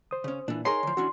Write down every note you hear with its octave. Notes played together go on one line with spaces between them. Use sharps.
C5 D#6
C#3 C#4
A#2 E3 D4
D#4 G#4 A#4 C#5 G#5 A#5 C6
D3 F3
E3 C#4 D4 F#4